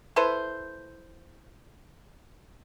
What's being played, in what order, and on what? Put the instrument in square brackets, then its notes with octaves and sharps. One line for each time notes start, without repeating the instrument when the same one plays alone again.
[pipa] E4 A4 B4 C5